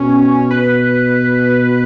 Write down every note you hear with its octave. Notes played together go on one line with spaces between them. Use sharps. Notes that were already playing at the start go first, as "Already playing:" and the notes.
Already playing: B2 C#4
B4